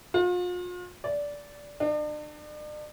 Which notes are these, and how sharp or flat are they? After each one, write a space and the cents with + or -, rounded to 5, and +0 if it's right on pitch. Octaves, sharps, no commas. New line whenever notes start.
F4 +40
D5 -15
D4 +40